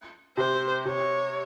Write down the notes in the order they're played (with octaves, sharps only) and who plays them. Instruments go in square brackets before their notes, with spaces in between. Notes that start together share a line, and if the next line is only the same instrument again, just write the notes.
[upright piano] C3 [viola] C5
[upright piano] C3 [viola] C#5